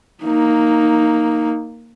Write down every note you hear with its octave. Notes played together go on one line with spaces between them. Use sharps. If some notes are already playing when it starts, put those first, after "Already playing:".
A#3 D#4